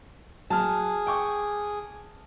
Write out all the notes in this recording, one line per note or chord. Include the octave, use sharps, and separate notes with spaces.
F#3 G#4 A5 F6
G5 C#6 D6